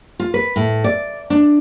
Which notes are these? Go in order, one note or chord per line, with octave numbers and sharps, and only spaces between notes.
F4
B4
A2
D5
D4